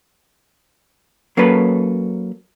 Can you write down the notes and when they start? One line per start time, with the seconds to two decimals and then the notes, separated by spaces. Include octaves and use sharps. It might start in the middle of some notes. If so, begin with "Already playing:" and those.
1.37 F#3 A#3 C#4 A4 B4